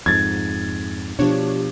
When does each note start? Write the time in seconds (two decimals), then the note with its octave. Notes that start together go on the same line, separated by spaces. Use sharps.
0.06 F2 G#2 G#6 A6
1.19 B2 F3 D4 G4 C#5